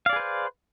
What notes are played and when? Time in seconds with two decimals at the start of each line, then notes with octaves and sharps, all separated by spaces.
0.06 F5
0.09 D5
0.13 G#4
0.16 B4
0.20 C5